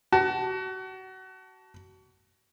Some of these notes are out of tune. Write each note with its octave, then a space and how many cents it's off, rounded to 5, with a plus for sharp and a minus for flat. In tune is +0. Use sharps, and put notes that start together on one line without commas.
F#4 +30 A5 +0